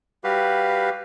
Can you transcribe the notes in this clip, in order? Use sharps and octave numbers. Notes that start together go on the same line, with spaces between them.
G3 F#4 G4 B4 F5